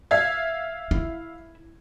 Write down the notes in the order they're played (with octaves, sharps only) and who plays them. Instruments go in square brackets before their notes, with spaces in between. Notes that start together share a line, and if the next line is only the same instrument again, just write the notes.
[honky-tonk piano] E5 F5 G#6
[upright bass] E4